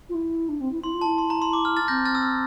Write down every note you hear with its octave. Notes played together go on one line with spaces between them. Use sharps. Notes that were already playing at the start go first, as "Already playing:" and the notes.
F4
E4
D4
C4
E4
E4 C6
F4
A5
E4
C6
A#5
C6
D6
F6
F6 A6
C4 G6 A#6
F6 A6
E6
F6